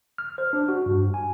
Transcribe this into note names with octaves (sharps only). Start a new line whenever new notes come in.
F6
C5
D4
F#4
G2
G#5